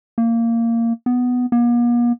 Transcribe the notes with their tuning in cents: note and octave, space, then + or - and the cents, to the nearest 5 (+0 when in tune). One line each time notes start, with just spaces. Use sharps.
A#3 -15
B3 +5
A#3 +45